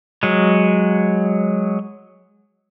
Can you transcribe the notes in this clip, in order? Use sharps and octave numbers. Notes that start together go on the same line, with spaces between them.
F#3 G#3